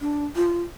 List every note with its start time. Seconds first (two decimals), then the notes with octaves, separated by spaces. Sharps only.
0.01 D4
0.36 F4